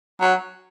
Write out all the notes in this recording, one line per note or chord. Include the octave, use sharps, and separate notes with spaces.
F#3